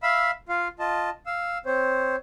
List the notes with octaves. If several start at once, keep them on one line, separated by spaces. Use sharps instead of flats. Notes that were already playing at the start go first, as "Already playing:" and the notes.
E5 F5 B5 E6
F4 F5
F4 D#5 A5
F5 E6
C4 C5 C#5